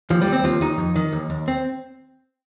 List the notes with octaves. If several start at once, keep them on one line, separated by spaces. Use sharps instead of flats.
D#2 F3
G3
D#2
C4
D#2 F4
D#2 D#4
F2
D#3
D#2
D#2
C4